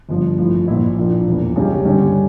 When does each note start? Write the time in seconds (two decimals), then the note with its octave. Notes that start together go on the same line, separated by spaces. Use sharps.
0.09 G1 G2 F3
0.38 A1 A2 F3
0.68 A#1 A#2 F3 A#3 E4
0.97 A#2 F3 A#3 D4
1.27 E1 E2 E3 A#3
1.56 C#2 C#3 G3 C#4 G4
1.85 G2 D3 G3 C#4 G4